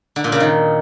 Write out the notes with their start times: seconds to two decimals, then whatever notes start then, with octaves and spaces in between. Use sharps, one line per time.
0.16 D3
0.24 A#2
0.32 C#3
0.40 D#3